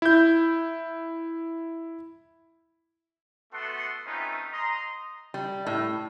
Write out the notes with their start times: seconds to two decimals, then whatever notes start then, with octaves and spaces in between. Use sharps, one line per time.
0.02 E4 G6
3.53 A3 B3 F#4 A4 F#5 C6
4.06 A3 C4 C#4 D#4 F4 B4
4.52 D#5 A#5 C6
5.34 G3
5.66 A2